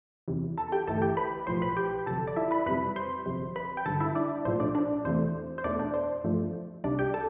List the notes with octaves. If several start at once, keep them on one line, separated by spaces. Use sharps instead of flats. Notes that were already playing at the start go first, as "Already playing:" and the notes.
E2 C3 E3
A4 A5
G4 G5
G1 G2 E3 A3 A4 A5
G4 G5
B4 B5
B1 A2 F3 C5 C6
B4 B5
G4 G5
G1 F2 C3 A4 A5
D5
E4 E5
B4 B5
F2 C3 G3 B4 B5
C5 C6
G1 F2 C3
B4 B5
G5
G1 G2 D3 A4 A5
E4 E5
D4 D5
B1 A2 F3 A3 C5
D4 D5
D4 D5
E2 C3 E3 A3 C5
C5
E2 B2 A3 D4 D5
D4 D5
C5
G2 F3 A3
C2 C3 G3 D4 D5
G4 G5
A4 A5